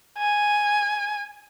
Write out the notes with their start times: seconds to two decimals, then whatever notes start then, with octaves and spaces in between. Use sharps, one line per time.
0.18 G#5